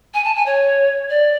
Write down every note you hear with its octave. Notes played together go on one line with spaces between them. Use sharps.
G#5
A5
G#5
C#5
D5